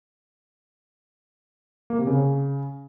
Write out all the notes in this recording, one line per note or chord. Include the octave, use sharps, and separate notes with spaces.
A#3
C3
C#3